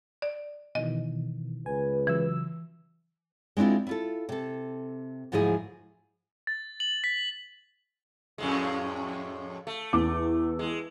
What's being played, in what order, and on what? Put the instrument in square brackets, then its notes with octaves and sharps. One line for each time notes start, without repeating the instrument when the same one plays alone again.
[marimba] D5
[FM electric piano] B2 D#3 E3 [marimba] D#5
[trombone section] C#2 B4 [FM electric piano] G#5
[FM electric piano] C#3 F#3 E6 [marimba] E3
[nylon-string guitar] G#3 C4 D4 E4 F4
E4 F4 A4
C3 A4
D2 G#2 F3 F#3 E4 G#4
[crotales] A6
F#7
B6
[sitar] F2 A2 G#3
A3
[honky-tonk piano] E2 D6
[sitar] G#3